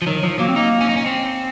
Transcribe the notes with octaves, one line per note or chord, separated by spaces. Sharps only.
F3
D#3 F#3
F3 F#3
F#3 A#3
C4
A#3 D#4
C#4
D#4
C#4
C4